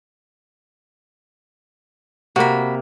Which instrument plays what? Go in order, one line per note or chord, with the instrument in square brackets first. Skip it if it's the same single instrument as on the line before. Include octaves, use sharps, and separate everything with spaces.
[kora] C3 A#3 [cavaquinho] F#4 B5